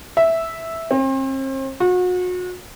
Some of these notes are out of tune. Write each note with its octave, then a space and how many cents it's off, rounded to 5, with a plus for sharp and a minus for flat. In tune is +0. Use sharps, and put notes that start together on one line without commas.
E5 -5
C4 +40
F#4 -35